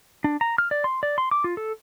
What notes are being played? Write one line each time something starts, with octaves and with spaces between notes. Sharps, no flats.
D4
A#5
F6
D5
C6
D5
C6
D6
F4
A4